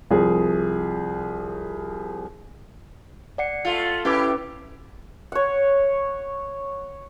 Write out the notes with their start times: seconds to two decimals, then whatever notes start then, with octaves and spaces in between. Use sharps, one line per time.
0.11 C2 F3 G#4
3.38 D5 F#5 C#7
3.65 A3 F4
4.05 C#4 E4 G4 B4 D6
5.32 C#5 F#5